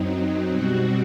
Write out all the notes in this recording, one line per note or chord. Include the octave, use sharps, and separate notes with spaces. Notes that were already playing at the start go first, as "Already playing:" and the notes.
Already playing: F#2 F#3 C4 D#4
D#4
B2 G3 C4 F#4